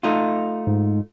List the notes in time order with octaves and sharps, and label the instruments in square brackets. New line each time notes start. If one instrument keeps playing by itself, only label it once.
[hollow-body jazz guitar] A3 D#4 F4
[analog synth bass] G#2